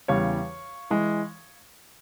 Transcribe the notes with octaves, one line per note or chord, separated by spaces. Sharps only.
E2 C#3 E3 G3 C#5 F5
E3 G#3